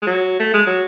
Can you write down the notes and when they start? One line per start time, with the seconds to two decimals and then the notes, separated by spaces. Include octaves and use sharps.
0.02 G#3
0.07 F#3
0.40 A3
0.53 G#3
0.66 F#3